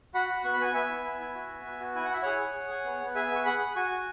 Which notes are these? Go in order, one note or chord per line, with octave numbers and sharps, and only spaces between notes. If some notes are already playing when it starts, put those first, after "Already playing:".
F#4 F#5 B5
F#4
B3 C#6
B5
B3 G#5 C#6
B3 E5 G#5
E4
B3
E4
F#4
B3
B3
F#4
E4 G#5
F#5
E4 E5
G#4 C#5 F#5
G#4
G#4
G#4
B3
B3
G#4 E5 G#5
B3 C#6
G#4 F#5 B5
G#4
F#4 G#5 C#6
F#4